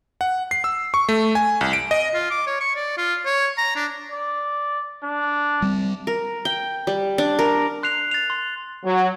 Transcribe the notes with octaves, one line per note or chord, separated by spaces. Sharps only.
F#5
C7
E6
C#6
A3
G#5
C2
D7
D#5
F4
D6
C#5
C#6
D5
F4
C#5
A#5
D4
D5
D4
G3 C4
A#4
G5
G3
D4
A#4
C6 F#6 C7 F7
A6 F7
C6
F#3